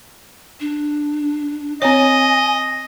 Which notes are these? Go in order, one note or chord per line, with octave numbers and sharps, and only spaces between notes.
D4
C4 C#5 D#5 G#5